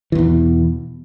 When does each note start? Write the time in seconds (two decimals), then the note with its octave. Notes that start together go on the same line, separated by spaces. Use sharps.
0.12 E3
0.15 E2
0.18 B2